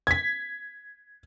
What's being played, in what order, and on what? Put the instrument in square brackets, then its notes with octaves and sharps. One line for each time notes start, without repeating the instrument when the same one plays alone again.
[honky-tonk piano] G#6 B6